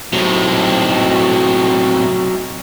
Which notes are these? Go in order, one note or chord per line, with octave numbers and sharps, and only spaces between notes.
A2 C3 F#3 D#4